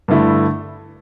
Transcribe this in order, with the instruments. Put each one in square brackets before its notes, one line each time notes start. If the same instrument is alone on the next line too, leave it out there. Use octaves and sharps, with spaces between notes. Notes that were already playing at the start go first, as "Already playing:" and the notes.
[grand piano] G2 D3 A3 E4